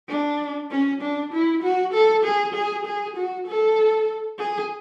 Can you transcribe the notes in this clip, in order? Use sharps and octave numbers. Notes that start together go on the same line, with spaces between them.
D4
C#4
D4
E4
F#4
A4
G#4
G#4
G#4
F#4
A4
G#4